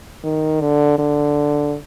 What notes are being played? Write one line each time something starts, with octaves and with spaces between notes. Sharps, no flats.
D#3
D3
D3